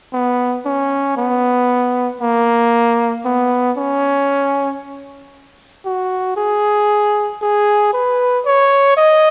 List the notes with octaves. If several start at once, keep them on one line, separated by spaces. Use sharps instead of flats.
B3
C#4
B3
A#3
B3
C#4
F#4
G#4
G#4
B4
C#5
D#5